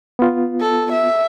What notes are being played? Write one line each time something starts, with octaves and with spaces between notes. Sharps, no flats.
B3 F4
A4
E5